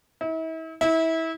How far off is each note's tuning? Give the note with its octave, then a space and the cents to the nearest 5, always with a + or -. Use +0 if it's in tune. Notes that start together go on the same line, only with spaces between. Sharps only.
E4 -40
E4 -25